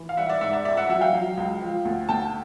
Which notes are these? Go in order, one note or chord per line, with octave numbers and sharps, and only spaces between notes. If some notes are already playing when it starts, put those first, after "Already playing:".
Already playing: E3
F5
G3 E5 F#5
D5 E5
G#2 E5 F#5
D5 E5
C#2 D5 E5
E5 F#5
F#3 E5 F#5
F5 G5
F#3
C#2
F3
D2
D2 G5 A5